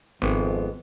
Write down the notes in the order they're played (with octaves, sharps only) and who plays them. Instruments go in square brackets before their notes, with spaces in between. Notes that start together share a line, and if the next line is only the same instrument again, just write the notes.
[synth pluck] G#1 [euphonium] F2 [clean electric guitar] G#3 B3